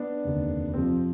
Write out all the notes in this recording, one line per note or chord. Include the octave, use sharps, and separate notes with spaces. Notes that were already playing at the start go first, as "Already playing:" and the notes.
Already playing: B3 D4
F1 D#2 D3
F2 C3 F3 C4